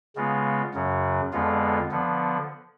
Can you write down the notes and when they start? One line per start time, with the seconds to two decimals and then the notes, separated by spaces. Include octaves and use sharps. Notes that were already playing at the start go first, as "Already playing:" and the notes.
0.16 C#3 G#3 B3 F4
0.74 F#2 C#3 F#3
1.32 F2 D3 G#3 B3 F4
1.91 D3 F3 B3